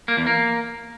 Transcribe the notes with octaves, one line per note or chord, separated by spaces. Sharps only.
A#3
E2
A#3